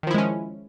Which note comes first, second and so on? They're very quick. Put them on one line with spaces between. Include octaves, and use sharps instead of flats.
D#3 F3 E4 G#3 C#4